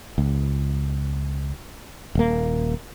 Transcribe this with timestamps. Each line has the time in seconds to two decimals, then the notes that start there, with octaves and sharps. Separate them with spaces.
0.18 C#2
2.15 D#1 A#3